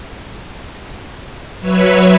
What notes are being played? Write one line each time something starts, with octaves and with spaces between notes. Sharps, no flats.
F#3 B4 C#5 E5